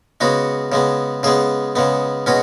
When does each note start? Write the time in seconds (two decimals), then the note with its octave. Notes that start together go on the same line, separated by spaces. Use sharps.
0.21 C#3 G#3 B3 F#4
0.72 C#3 G#3 B3
1.23 C#3 G#3 B3 G#4
1.76 C#3 G#3 B3
2.26 B2 G#3 C#4 F#4